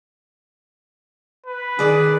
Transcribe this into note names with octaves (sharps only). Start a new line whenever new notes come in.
B4
D#3 G#4 D5